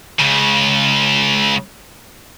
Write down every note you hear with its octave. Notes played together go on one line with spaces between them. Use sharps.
C#2 C#3